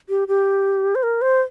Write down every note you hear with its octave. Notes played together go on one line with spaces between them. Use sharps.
G4
G4
C5
A#4
C5